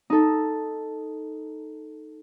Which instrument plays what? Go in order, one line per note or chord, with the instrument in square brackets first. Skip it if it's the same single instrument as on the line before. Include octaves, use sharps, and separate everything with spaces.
[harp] D#4 A4